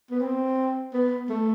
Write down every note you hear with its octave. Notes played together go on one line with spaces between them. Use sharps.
B3
C4
B3
A3